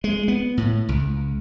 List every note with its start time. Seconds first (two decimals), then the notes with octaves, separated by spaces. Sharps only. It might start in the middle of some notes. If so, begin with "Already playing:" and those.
0.04 G#3
0.28 B3
0.57 A2
0.89 C#2